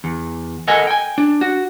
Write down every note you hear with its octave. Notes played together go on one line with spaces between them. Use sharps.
E2
A4 A#4 D#5 F#5 G#5
G5 G#5
D4
F#4